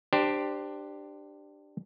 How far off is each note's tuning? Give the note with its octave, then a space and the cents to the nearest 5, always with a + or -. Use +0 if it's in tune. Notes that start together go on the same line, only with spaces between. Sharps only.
D4 +15 G4 +0 C5 -5